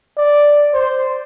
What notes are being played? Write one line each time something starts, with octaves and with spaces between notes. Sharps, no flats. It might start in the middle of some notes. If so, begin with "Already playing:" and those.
D5
C5